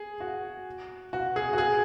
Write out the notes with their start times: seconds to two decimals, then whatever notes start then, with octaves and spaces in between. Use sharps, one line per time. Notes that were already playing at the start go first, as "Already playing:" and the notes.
Already playing: G#4
0.20 F#4
1.13 F#4
1.36 G#4
1.53 F#4
1.58 G#4